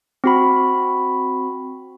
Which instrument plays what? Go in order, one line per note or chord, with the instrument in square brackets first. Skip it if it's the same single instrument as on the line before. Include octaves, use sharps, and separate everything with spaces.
[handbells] C4 F#4 B5